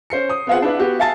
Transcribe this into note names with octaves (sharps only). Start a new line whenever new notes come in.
C#4 C5 C7 C#7
D#6
B3 C4 F4 G#4 F#5
D4 E4 B4
B3 F#4 G4
E5 F5 G#5 A5 A6